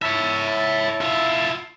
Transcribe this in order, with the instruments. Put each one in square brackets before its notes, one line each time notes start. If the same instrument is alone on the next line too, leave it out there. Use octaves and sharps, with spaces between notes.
[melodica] E4 A5 [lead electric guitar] C#5 E5
[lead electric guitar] F4 E5